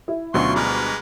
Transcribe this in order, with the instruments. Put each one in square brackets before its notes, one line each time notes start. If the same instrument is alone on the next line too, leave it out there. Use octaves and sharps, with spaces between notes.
[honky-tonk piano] E4
[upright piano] D2 B2 [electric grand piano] F#3 C#4 F4 [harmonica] C6 C#6
[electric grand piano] G3 [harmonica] G#3 B4 A#5 [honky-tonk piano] D6 F6